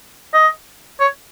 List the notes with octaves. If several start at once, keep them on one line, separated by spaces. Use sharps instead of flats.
D#5
C#5